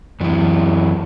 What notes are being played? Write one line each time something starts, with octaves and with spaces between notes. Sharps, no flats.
F#2 E3